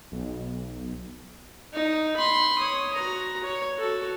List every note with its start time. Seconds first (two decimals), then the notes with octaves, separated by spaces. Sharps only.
0.12 B1
1.73 D#4
2.17 B5 C6
2.58 C#5 D#6
2.95 F#4 A#5
3.43 C#5
3.77 F#4 A4